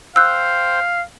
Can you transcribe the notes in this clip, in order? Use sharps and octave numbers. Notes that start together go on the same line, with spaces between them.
C5 F5 G5 E6 F#6